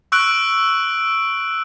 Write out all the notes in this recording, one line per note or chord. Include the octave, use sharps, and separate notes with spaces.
C#6 E6 F#6 D7 F#7